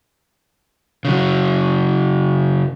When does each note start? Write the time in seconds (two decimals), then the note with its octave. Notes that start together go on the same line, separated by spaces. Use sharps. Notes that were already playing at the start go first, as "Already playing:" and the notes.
1.05 C#3 F#3